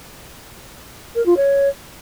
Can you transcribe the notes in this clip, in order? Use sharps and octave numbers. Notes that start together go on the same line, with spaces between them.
A#4
F4
C#5